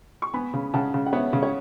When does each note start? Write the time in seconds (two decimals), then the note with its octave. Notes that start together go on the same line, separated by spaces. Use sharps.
0.22 C#6
0.33 B3 G#5 B5
0.54 C#3
0.74 C#3 F#5 A5
0.94 C#3
1.06 F#5
1.13 B3 C#5 E5
1.33 C#3
1.43 C#5